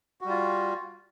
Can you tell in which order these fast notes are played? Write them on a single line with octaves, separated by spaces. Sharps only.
F#4 G3 F4